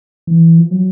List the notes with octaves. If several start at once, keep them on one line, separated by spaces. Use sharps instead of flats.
E3
F3
F#3